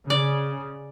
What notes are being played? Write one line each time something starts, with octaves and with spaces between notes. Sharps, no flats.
C#3 D5